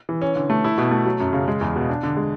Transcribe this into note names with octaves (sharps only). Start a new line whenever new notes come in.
E3
C#4
D3
A3
E4
B2
A3
F#3
F#2
C#3
G#3
E2
B2
D4
D3
G#3